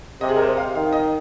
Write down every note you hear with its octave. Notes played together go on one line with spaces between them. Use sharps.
C3 D#5
G#4
A#4
C5
D#5
F5
D#3 F5
D#5